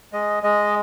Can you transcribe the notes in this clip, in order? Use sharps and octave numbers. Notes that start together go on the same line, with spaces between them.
G#3 D#5
G#3 D#5